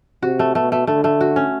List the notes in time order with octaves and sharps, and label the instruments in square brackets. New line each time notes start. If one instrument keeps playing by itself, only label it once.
[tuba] C3 [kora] F#4
[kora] A3
[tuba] B2 [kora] A3
[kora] A3
[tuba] D3 [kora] A3
[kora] A3
F#4
C#4